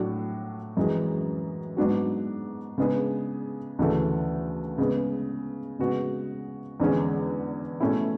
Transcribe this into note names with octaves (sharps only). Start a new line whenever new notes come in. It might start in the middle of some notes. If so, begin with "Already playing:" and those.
Already playing: A2 F#3 A3 D4 F#4
F#2 E3 G#3
G#2 F#3 B3 D4 F#4
C#3 G#3 B3 D4 G#4
D2 C#3 E3 A3
C#3 G#3 B3
C#3 G#3 B3 F#4
E2 D3 G#3 C#4
B2 A3 C#4 E4 G#4